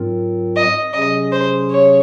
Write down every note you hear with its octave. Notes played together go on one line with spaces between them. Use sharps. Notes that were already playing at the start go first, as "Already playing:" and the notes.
Already playing: G#2 F#3 C4 F4 A#4
D#5
C3 F#3 C#4 G#4 D#5
C5
C#5